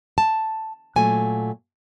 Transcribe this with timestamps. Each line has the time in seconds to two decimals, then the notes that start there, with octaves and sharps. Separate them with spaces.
0.18 A5
0.96 A#2 F#3 A3 G#5